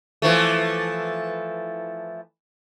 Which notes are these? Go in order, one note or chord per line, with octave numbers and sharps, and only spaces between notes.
E3 F3 A3